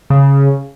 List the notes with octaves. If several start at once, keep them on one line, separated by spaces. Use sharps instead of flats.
C#3